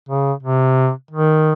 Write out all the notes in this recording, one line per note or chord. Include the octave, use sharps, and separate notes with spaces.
C#3
C3
D#3